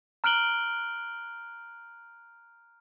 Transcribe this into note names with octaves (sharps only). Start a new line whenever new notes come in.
A#5 F6 F#6 D7 F#7 G7